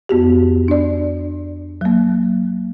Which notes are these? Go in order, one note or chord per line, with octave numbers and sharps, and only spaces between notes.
F2 B3 F#4 G4
D4 D5
F#3 A#3